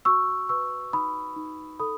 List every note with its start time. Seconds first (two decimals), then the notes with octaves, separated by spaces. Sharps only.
0.05 F#4 C#6 E6
0.49 B4 C#6 E6
0.93 D#4 B5 D#6
1.36 D#4
1.80 A4 B5 D#6